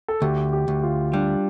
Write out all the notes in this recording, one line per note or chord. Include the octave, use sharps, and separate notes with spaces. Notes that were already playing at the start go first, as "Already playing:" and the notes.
A4
D2 G4
G4
D2
F4
G3 D4